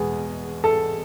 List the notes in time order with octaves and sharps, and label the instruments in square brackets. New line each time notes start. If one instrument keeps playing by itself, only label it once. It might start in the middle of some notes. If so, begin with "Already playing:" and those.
Already playing: [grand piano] E2 B2 G#3 B3 G#4
A4